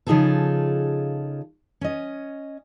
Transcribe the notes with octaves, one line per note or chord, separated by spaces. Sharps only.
C#3 F3 D#4 F4 G#4 A4
C#4 D#5